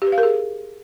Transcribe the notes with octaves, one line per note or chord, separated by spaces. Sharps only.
G4
B4
F5
A#4
G#4